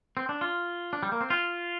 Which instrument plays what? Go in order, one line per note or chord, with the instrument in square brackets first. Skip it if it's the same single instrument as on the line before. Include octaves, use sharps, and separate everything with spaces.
[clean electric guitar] C4
D4
F4
D4
G3
A#3
C4
F4